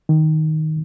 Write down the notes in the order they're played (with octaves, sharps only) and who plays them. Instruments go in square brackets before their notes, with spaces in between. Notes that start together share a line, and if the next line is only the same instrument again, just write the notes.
[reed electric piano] D#3